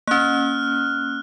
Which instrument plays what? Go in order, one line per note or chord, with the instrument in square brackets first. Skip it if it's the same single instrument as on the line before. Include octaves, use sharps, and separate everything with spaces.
[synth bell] A#3 C#4 [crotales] F6 F#6